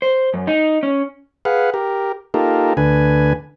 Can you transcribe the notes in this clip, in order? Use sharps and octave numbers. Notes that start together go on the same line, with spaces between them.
C5
F#2
D#4
C#4
G#4 B4 F5 F#5
G4 A#4
A#3 D#4 F4 G4 A4 A#4
D2 D3 B4 G#5